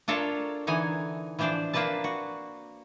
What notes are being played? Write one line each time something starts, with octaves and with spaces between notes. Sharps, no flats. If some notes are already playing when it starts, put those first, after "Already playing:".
D4 F4 A4 A#4 C#5
D3 E3 D#4 G#5
E3 F3 D4 C5 D5
A#3 C4 D4 B4 A5
F#4